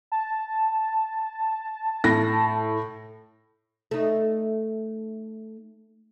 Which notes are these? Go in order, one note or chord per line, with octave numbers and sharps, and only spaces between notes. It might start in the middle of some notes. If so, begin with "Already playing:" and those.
A5
A2 A#6
A3 D#4